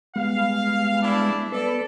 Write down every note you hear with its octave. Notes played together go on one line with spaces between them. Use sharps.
G3 G#3 B3 F5
D4 E4
B3 A4 B4 D5